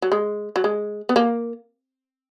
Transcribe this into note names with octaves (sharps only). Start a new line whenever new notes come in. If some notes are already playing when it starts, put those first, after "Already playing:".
F#3
G#3
F#3
G#3
B3
A#3